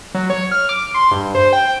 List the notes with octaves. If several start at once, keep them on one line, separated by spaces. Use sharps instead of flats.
F#3
C#5
F6
D6
C6
G2
C5
G5